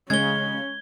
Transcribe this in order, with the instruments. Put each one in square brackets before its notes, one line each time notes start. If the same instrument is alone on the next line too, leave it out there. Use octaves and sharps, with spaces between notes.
[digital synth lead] C#3 [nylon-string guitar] G#3 C#5 [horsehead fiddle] C#4 [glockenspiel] G#6 G7